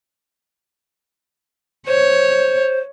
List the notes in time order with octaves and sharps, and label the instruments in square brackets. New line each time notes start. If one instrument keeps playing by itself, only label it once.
[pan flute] C5 [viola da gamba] C#5